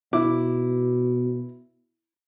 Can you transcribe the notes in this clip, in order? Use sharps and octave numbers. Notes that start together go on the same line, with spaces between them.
B2 E4 D6